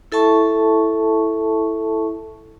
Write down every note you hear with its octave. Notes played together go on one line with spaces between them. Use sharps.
E4 A4 E5 A5 C#6